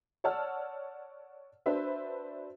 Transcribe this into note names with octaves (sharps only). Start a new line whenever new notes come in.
C#5 D5 F#5 A5 E6 F6
D4 F#4 B4 C5 E5